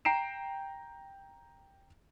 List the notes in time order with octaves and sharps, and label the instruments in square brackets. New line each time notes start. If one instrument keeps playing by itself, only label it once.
[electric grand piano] G5 A#5 C7 D7 E7